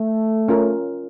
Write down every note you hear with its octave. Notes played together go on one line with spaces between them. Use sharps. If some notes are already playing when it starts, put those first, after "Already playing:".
Already playing: A3
C#4 F4 A#4